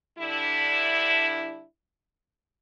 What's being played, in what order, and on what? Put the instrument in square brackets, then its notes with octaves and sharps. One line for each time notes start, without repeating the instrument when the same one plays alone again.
[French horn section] D3 G3 D4 E4